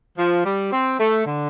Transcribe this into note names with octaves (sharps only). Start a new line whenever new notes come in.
F3
G3
C4
A3
D3